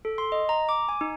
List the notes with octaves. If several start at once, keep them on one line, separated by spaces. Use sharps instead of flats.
A4
C6
D#5
A#5
D6
G#5
D#4